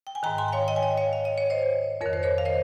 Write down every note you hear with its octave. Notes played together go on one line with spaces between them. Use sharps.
G5
G#5
G#2 D#3 G5 A#5
G#5 C6
G5
C#5 F5
D#5 G5
G#5
D#5 G5
C#5 F5
F5
D#5
C#5
C5 D#5
F2 D#3 A#4 C#5
C5
A#4 C#5
F5
C5 D#5